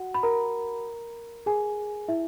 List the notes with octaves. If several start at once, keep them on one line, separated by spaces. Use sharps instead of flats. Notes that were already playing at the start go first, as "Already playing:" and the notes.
Already playing: F#4 F#5
B5
A#4 A#5
G#4 G#5
E4 E5